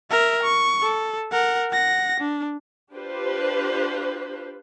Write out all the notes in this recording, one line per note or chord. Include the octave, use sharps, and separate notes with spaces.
A#4 E5
C#6
A4
A#4 F#5
F#5 A#6
D4
D4 F4 G4 B4 C5